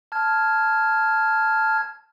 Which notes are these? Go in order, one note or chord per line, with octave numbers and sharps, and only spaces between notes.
A5 F6 G#6